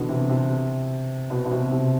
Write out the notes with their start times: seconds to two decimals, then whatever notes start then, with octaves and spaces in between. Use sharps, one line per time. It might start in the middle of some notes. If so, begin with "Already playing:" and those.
Already playing: B2 D3 E3
0.09 C3
0.29 C3
1.30 B2
1.45 B2
1.51 C3
1.71 C3